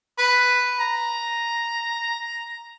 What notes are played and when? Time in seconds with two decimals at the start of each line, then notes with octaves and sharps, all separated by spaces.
0.18 B4
0.80 A#5